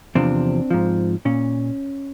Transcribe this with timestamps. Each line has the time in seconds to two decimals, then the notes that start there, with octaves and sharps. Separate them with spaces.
0.15 E2 C3 F3 C4 D4
0.70 G#2 F3
1.25 A#2 C#4